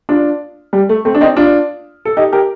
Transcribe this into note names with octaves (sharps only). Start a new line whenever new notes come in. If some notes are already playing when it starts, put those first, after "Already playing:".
D4 F4
G3
A3
A3 C4
D4
C4 D#4
D4 F4
A4
D#4 G4
G4 A#4